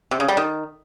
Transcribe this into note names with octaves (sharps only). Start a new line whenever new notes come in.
C3
C#3
G3
D#3